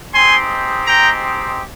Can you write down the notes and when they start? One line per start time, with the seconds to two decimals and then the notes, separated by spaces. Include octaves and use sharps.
0.14 G#3 C4 D#4 G4 G#5 C6
0.87 G5 A#5